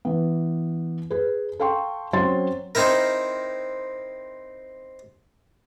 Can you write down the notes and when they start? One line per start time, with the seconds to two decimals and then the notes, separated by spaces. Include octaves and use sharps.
0.05 E3 B3
1.11 G#4 B4
1.60 A4 F5 G5 C6 C#6
2.13 F#3 C4 C#4 C6 A6
2.75 C4 D#4 E4 A#4